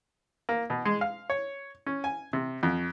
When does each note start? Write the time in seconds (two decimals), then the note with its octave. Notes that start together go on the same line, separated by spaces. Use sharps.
0.49 A#3
0.70 B2
0.85 G#3
1.01 F5
1.30 C#5
1.86 C#4
2.04 G#5
2.33 C3
2.63 F2